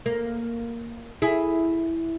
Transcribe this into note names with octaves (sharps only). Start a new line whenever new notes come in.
A#3
E4 G#4